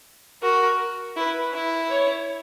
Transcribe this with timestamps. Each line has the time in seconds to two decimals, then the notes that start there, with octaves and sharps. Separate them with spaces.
0.42 F#4 A#4
1.16 E4 B4
1.53 E4
1.90 C#5